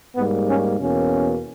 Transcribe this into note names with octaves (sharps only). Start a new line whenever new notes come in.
G#2 G3 A#3 B3
C#4
E2 B2 A#3 C#4